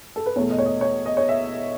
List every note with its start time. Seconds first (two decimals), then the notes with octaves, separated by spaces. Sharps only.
0.16 A4
0.26 B4
0.36 E2 B2 A3 C#5
0.50 D#5
0.59 C#5
0.66 D#5
0.81 C#5
1.06 D#5
1.17 C#5
1.29 E5